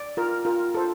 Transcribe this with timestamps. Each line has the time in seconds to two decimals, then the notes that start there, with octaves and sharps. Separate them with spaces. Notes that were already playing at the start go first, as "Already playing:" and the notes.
Already playing: D5
0.17 F4 A#4
0.45 F4 A#4
0.74 F4 A4 C5